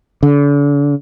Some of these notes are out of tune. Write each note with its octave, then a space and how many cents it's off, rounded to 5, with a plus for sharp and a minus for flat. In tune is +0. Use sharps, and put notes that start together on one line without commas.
D3 -40